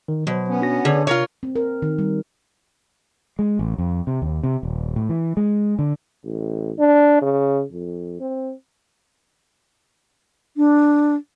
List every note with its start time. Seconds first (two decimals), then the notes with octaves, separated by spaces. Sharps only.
0.08 D#3
0.27 B2 F#3 C5
0.48 B3 C#4
0.61 D4 F#4 A#6
0.85 D3 G#4 C#5 D5
1.07 C3 F4 A#4 C#5
1.43 C4
1.56 A#4
1.82 D#3
1.98 G3
3.39 G#3
3.59 A1
3.78 F2
4.07 C3
4.22 D#2
4.43 C3
4.63 D#1
4.96 A2
5.09 E3
5.37 G#3
5.79 D3
6.24 A1
6.79 D4
7.22 C#3
7.72 F2
8.20 C4
10.57 D4